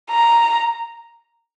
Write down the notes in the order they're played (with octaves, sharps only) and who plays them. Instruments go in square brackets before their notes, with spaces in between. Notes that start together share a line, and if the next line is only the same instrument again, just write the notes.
[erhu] A#5